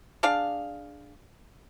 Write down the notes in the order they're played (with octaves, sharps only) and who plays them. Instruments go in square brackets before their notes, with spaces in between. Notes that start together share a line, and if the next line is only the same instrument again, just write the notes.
[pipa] D4 G#4 D5 F5